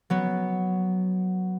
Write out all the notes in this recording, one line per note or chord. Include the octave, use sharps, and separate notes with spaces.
F#3 B3